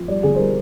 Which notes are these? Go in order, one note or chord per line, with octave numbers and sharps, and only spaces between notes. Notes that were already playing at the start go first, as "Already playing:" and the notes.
Already playing: F3
G3 D5
D3 G#4
C5
G3 A#4